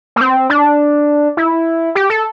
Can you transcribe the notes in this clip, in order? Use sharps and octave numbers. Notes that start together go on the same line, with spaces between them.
A#3
C4
D4
E4
G4
A4